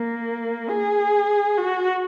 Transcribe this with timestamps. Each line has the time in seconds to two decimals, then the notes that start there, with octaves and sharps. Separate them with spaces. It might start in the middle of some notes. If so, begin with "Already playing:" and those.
Already playing: A#3
0.69 G#4
1.57 F#4